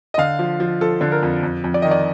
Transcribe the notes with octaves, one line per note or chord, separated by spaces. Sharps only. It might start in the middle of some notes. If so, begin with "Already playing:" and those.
D#5
D3 F5
F3
F3
F3 A4
D3
A#4
F2
F2
F2
D5
D#3 D#5
D5